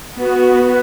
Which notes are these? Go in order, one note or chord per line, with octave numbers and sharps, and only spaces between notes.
B3 F#4 B4